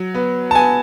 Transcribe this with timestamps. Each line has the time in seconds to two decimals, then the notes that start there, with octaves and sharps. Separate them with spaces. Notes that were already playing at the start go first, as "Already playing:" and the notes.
Already playing: F#3
0.14 B3
0.51 A5
0.55 B3 G#5